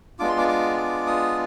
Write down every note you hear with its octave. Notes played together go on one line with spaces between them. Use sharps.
G#3 B3 D4 F4 D6
C6
D6
D6
D6
D#6